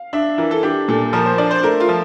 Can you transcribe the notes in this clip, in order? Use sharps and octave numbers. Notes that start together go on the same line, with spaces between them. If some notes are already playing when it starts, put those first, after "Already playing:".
Already playing: F5
D4 E5
E3 A#4
A4
D4 G4
A#2 A4
F3 A#4
C5
D4 D5
C5
A3 A#4
F4
F3